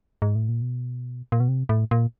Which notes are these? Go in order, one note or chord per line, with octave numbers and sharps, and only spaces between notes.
G#2
A2
A#2
B2
A#2
B2
C3
A2
A#2